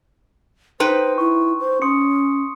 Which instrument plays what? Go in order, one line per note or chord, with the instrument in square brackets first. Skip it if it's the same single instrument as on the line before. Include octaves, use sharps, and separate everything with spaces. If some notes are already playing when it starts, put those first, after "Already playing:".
[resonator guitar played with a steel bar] D#4 B4 G5 [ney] C5 [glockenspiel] C6
[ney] E4 [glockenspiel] C#6
[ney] C5
[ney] C#4 [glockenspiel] C6 D#6 C#7